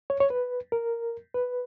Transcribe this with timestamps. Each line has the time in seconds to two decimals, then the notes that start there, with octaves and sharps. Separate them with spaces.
0.10 C#5
0.20 C#5
0.30 B4
0.72 A#4
1.34 B4